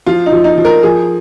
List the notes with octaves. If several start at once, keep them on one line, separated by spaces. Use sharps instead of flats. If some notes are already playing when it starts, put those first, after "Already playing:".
F3 F4
D#4
F3
D#4
F3
A#4
F3 G#4